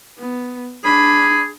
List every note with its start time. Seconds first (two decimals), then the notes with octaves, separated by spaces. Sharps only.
0.18 B3
0.84 D4 G#4 B5